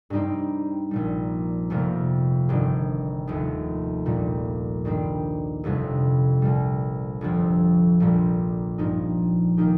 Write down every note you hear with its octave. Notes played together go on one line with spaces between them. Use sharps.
G2 G3 C4 D#4 G4
A#1 A#2 G3
F1 F2 C3 G3 A#3
G1 G2 D#3 C4 G4
F1 D#2 D#3
A#1 A#2 G3
G2 D#3 G3 C4
G1 F2 C3 G3
C2 A#2 G3
G1 F2 F3 C4
A#1 A#2 G3 A#3
G2 F3 D#4
D#3 A#3 D#4 G4